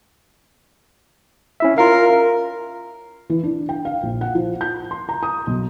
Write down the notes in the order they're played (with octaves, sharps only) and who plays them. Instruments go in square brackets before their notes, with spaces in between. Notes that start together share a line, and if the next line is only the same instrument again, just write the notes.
[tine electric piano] C#4 E4 E5
[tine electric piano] F4 F5 [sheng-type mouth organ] A#4
[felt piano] E3
D4
G5
F5
A#1
F#5
F3
G6
C6
A#5
D#6
B1